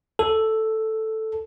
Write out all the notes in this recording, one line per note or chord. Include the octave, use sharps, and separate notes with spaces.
A4